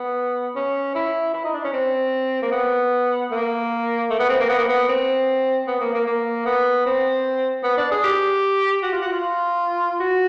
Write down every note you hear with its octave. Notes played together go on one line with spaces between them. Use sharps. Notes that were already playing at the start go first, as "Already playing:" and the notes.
Already playing: B3
C#4
E4
E4
D#4
D4
C#4
C4
A#3
B3
A#3
A3
B3
C4
A#3
B3
A#3
B3
C4
B3
A#3
A#3
A#3
B3
C4
B3
D4
G#4
G4
F#4
F4
F#4
F4
F#4